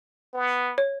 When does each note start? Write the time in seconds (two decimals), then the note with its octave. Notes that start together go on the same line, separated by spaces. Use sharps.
0.34 B3
0.78 C#5